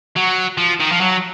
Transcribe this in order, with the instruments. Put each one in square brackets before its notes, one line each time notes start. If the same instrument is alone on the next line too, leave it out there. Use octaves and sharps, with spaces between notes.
[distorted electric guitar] F#3
F3
D#3
F3
F#3